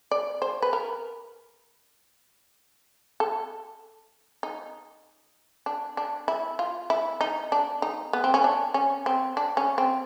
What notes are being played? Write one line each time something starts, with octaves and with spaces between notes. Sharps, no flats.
D5
C5
B4
A#4
A4
D#4
D4
D4
E4
F4
E4
D#4
D4
D#4
B3
C4
C#4
D4
C#4
C4
D4
C#4
C4